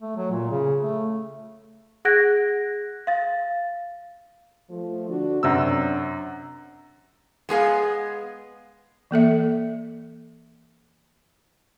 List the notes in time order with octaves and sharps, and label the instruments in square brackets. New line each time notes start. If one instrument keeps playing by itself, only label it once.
[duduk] A3
F#3
A#2
C#3
A3
[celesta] G#4 F#5 F#6 G#6 A#6 D7
F5 A6
[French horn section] F3 A3
D3 D4 F#4
[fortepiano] F#2 C3 E6 [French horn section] C#4 D4
[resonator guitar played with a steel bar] G#3 B3 G#4 F5
[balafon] E3 A#3 A4 E5